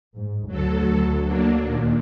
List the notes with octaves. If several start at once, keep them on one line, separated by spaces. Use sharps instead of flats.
G#2
D2 F#3 A4
F#3 A#3 D4
D#2 A#2